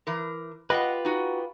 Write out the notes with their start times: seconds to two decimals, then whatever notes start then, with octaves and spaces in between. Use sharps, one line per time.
0.07 E3 A#4
0.70 F4 G4 B4 D#5 F#5
1.05 D#4 F#4